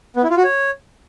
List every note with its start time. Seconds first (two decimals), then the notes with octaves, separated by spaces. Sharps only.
0.16 B3
0.23 E4
0.30 F4
0.37 F#4
0.44 C#5